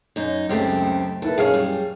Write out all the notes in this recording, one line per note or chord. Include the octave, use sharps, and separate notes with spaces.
F#2 D#4
C#2 F#2 A3 C4 G4
A#3 E4 A4 B4
F#2 G#4 C#5 F5 F6
G3